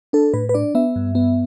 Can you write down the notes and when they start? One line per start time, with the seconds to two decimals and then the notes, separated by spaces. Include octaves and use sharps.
0.13 D4 A4
0.33 A2 B4
0.49 B4
0.54 D4 D5
0.75 B3 E5
0.96 G2
1.15 B3